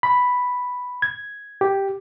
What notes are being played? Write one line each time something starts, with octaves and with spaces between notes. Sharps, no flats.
B5
G#6
G4